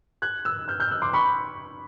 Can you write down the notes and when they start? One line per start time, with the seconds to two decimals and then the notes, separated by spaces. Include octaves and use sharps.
0.22 F#6 G#6
0.45 E6 F#6
0.68 F6 G6
0.80 F6 G6
0.91 E6 F#6
1.02 C6 D6
1.13 B5 C#6